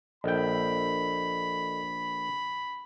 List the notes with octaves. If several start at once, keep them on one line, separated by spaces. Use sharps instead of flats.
A#1 A4 D#5 G5 B5